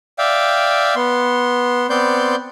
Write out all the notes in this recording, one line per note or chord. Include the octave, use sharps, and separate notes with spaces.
D5 E5 F5 G5
B3 C6
B3 C4 D5 C6 G6